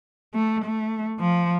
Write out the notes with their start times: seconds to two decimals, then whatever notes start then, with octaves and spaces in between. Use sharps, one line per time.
0.35 A3
0.65 A3
1.20 F3